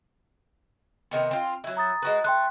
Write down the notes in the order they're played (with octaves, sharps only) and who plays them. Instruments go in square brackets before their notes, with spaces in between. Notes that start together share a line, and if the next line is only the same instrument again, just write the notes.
[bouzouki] C3 D#3 B3
C4 F4
F#3 E4
[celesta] A#5 D#6 A6
[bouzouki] G#3 F#4 B4
[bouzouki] A3 [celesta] G5 C6 F#6